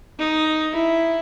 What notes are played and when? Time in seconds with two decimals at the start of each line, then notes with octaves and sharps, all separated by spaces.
0.19 D#4
0.74 E4